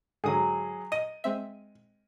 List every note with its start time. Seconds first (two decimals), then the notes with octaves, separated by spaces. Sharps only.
0.24 G#2 D3 F#3 G#4 D#6
0.92 D#5 D#7
1.24 G#3 C4 E5